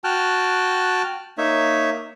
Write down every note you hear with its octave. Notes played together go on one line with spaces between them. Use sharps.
F#4 G5 A5 F6 F#6
A#3 D#4 C#5 E5